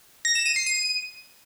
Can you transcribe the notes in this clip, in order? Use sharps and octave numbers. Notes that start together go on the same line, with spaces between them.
A#6
E7
D#7
C7
D#7